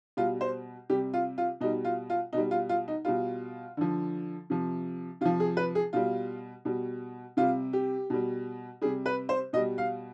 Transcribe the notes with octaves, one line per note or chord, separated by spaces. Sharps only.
B2 G3 F4
C5
C3 G3 G4
F4
F4
B2 G3 D#4
F4
F4
B2 G3 D#4
F4
F4
D#4
B2 G3 F4
D3 F3
C3 F3
C3 F3 F4
G#4
B4
G#4
B2 G3 F4
B2 G3
C3 G3 F4
G4
B2 G3
C3 G3 G#4
B4
C5
B2 G3 D#5
F5